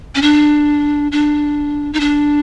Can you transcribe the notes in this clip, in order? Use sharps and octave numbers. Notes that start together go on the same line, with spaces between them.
C#4
D4
D4
D#4
D4